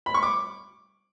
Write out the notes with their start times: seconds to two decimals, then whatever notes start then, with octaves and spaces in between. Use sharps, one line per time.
0.06 B5
0.14 C#6
0.23 D6